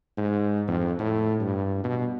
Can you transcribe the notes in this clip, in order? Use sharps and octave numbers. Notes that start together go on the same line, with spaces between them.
G#2
F2
A2
G2
B2